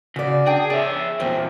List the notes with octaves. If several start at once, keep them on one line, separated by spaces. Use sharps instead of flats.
C#3 F#4 D5
D4 G#4 G5
G#4 C#5 D5 E5
E2 A#2 C4